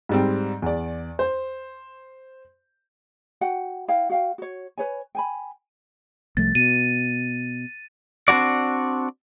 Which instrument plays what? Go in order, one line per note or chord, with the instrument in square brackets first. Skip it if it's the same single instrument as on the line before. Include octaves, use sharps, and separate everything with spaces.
[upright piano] G#2 G3 C4
E2 D5
C5
[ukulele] F#4 F#5 G5
E4 F5 G5
F#4 F5 G5
F#4 C#5
B4 C#5 G#5
G5 G#5 B5
[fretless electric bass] C2 F3 A3 [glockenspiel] A6
[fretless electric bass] B2 [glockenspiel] D#7
[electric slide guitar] C4 D4 F4 F#4 D5